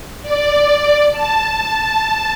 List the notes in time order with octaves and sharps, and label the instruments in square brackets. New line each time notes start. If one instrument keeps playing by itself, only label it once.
[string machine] D5
A5